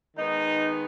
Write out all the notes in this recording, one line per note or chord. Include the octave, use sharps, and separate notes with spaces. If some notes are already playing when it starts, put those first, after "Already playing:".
D#3 G#3 B3 D#4